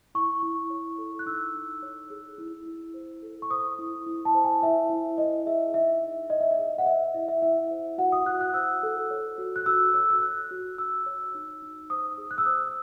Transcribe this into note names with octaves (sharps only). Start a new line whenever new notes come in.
E4 C#6
E4
C#5
A4
F#6
D#4 E6
D#4
C#5
G#4
E4
E4
C5
A4
C#6
C5 D#6
E4
E4
A5
C5
G#5
E4 E5
E4
C5 D#5
G#4 E5
D#4 E5
D#4
C#5 D#5
E5
D#5
G#4
F#5
C5 E5
E4 E5
E5
E4 E5
C5
F#4 F#5
D#6
F#4 F#6
F#6
C5 E6
A4
C#5
F#4
F#6
F#4 E6
C#5 E6
E6
C#5 F#6
F#4
F#4 E6
C#5
D#4
D#4
C5 D#6
G#4
F#6
E6
C5 D#6